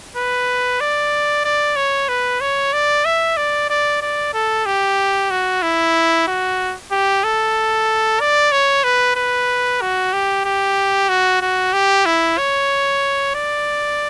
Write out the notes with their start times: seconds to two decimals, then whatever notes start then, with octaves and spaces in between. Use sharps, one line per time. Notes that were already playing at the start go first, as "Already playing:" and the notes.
0.17 B4
0.80 D5
1.45 D5
1.76 C#5
2.09 B4
2.41 C#5
2.73 D5
3.05 E5
3.37 D5
3.70 D5
4.02 D5
4.34 A4
4.66 G4
5.31 F#4
5.62 E4
6.28 F#4
6.92 G4
7.24 A4
8.20 D5
8.52 C#5
8.84 B4
9.16 B4
9.81 F#4
10.13 G4
10.45 G4
11.09 F#4
11.42 F#4
11.73 G4
12.06 E4
12.38 C#5
13.35 D5